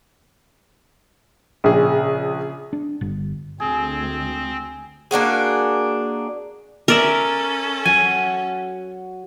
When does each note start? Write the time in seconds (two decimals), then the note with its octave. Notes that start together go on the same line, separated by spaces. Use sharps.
1.64 A#1 C#3 G#4
2.73 D4
3.01 G1
3.60 D2 C4 G#4
5.11 A#3 D4 F#4 G#4
6.88 C#4 A4 A#4 D5 E5
7.86 F#3 F#4 F#5 G#5